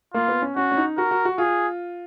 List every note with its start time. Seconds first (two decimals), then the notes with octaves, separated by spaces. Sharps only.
0.14 A#3 F4
0.28 B3
0.42 C#4
0.56 C#4 F#4
0.72 C#4
0.77 D#4
0.97 F#4 A#4
1.11 F#4
1.25 F#4
1.38 F4 G#4